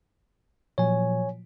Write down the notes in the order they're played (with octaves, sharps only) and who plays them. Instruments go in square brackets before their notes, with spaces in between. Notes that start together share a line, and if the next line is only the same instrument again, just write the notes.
[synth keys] A#2 F3 F#3 [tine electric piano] C#5 G#5